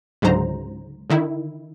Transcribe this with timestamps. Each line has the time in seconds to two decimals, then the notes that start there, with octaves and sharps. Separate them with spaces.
0.22 C#2 G#2 D3 F#3 C5 A#5
1.10 D3 D#3 D#4 E4